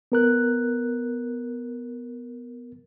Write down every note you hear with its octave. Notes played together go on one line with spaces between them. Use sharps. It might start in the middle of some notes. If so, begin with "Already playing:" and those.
B3 A#4 F#6